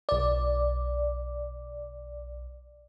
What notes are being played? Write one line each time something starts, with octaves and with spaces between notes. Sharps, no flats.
B1 D5